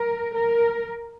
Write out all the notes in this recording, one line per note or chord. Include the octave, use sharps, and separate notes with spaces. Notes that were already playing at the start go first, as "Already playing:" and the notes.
Already playing: A#4
A#4